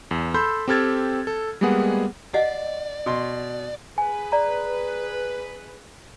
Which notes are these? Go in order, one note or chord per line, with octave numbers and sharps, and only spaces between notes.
E2
A4 B5 C6 E6 G6
C4 G4 A4 F6 G#6 A6
A4
G3 G#3 A#3 B3 G#4 F#5
D5 D#5 F5 F#5
B2 C6
G#4 B4 G#5
D5 A#5